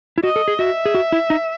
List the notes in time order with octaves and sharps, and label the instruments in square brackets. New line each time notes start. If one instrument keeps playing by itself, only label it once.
[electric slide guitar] E4
[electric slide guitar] F#4 [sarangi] D#5
[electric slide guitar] A4
G#4
[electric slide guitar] F#4 [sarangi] E5
[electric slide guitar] G#4
F#4
E4
D#4